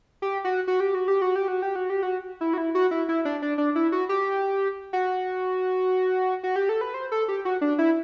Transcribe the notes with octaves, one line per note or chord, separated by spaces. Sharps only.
G4
F#4
F#4
G4
F#4
G4
F#4
G4
F#4
G4
F#4
G4
F#4
E4
F#4
E4
F#4
E4
E4
D4
D4
D4
E4
F#4
G4
F#4
F#4
G4
A4
B4
C5
A4
G4
F#4
D4
E4